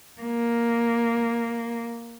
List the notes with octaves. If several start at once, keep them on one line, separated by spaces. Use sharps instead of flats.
A#3